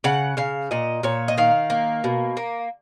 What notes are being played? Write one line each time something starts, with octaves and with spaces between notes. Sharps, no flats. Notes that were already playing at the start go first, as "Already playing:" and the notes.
C#3 F#5
C#3 F5
A#2 D#5
A#2 C#5
D#5
D#3 F5
A#3
B2
A#3